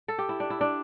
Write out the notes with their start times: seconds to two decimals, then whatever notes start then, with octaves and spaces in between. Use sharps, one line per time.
0.08 A4
0.19 G4
0.29 E4
0.40 D4
0.50 E4
0.61 D4